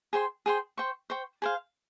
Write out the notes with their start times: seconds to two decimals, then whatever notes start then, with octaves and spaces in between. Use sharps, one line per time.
0.13 G#4 C5 G5 C6
0.46 G#4 C5 G5 C6
0.77 C5 G5 C#6
1.10 C5 G5 C#6
1.42 G#4 C5 F5